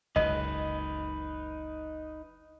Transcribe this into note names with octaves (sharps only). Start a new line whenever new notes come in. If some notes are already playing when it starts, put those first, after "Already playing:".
F#1 C#2 D#4 B4 D#5